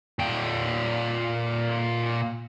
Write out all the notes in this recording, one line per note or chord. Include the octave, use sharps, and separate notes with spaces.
A#2 G5